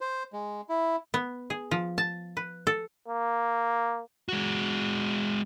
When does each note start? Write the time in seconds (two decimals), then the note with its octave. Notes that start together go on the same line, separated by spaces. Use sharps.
0.01 C5
0.33 G#3
0.69 E4
1.14 B3
1.50 G#4
1.71 F3
1.98 A5
2.37 B4
2.67 A4
3.08 A#3
4.29 G#3 F#4